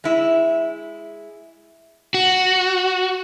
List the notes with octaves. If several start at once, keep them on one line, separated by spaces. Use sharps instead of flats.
G#3 E4
F#4